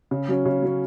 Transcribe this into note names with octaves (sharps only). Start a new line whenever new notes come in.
C#3
F#3 C#4
C#3
F#3 C#4